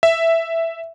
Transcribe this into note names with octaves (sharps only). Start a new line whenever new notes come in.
E5